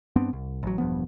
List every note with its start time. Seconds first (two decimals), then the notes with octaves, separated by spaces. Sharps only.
0.16 G2 B3 C4 D4
0.33 C2
0.63 A1 F#3
0.78 E1 G2 F3 B3